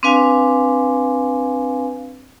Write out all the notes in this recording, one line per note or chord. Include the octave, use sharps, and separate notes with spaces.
C4 D4 B4 F5 G#5